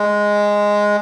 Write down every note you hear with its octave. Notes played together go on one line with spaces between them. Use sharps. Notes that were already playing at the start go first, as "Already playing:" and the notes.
Already playing: G#3